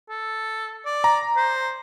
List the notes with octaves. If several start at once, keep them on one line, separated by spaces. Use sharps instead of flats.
A4
D5
A#5
C5